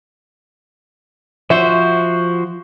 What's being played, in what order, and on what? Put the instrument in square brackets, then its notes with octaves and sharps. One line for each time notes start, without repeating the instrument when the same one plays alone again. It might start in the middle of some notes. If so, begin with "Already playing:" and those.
[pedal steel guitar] F3 F#4 C5 [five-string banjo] E5